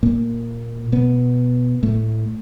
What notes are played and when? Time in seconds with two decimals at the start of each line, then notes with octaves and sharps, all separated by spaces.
0.03 A#2 A#3
0.92 B2 B3
1.83 A2 A3